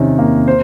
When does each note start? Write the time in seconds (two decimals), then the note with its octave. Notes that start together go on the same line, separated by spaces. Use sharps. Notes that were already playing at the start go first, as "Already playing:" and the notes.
Already playing: C3 D#3 C#4
0.18 A#3
0.48 C5